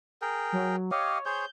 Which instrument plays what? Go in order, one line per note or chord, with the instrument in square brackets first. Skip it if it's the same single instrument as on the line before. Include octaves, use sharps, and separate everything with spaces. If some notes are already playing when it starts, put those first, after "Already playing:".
[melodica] G#4 A#4 G5
[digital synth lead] F#3
[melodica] G4 D#5 F5 [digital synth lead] C#5
[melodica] G#4 C5 C#5 [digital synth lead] G6